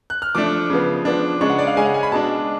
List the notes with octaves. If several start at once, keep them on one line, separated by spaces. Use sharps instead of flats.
F#6
F6
F3 A3 D4 D6
C#3 F3 B3
F3 B3 D4
C#3 G#3 D4 C#6
F#5
D5
F5
C#3 G#3 C#4 G#5
F#5
G#5
B5
B2 G#3 D4 A5